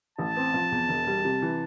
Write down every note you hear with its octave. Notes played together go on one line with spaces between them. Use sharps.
A1 A5
C4
F3
E2
E1
G3
C3
E3